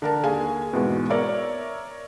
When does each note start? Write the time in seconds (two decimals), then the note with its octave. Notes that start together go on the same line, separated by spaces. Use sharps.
0.02 D3 A#4 A5
0.23 D#2 G#4 F5 G#5
0.73 E2 G#2 B2 G#3
1.10 A#4 C#5 D5 E5